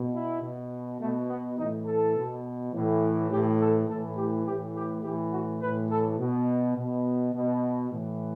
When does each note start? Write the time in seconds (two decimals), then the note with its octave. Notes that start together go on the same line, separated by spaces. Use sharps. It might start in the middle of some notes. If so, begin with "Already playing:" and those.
Already playing: B2
0.15 E4
0.42 B2
1.00 B2 A3
1.29 B3
1.57 E3 D#4
1.62 A2
1.87 A4
2.16 B2
2.73 A2 E3
3.31 A2 E3 G4
3.60 A4
3.88 A2 E3 A4
4.17 G4
4.46 A2 E3 G4
4.75 G4
5.03 A2 E3 G4
5.32 F#4
5.61 A2 E3 B4
5.91 A4
6.18 B2
6.76 B2
7.34 B2
7.91 A2 E3